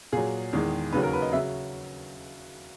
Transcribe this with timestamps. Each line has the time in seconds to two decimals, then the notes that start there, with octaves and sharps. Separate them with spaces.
0.12 A#2 F#3 G#4
0.53 E2 D#3 G#3
0.93 D#2 C#3 F#3 B4
1.03 A#4
1.13 B4
1.22 D#5
1.33 C#3 F#3 E5